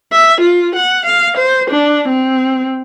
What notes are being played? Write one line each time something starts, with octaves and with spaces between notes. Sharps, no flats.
E5
F4
F#5
F5
C5
D4
C4